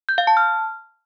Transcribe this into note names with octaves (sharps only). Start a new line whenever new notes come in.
G6
F5
A5
F6